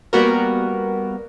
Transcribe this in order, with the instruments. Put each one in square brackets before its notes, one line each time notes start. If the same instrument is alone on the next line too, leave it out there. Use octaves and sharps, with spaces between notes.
[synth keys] G3 A#3 B3 F#4 A#4